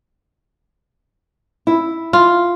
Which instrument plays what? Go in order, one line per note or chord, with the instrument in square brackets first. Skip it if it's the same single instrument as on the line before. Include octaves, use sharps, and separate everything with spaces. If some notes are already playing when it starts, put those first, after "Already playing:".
[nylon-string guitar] E4
[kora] F4